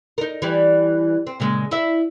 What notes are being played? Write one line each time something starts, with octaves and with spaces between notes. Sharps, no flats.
D#4 A#4
E3 G3
C4
A#2 C#3 G#3
E4 E5